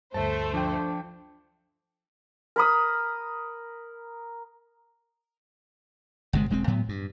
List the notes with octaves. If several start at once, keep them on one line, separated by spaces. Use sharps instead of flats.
D2 G2 A3 C5 A5
F3 D4 G5
A#4 B5 D#6
G1 C3 G#3
E1 G#3 A3 C4
A2 F#3 B3
G2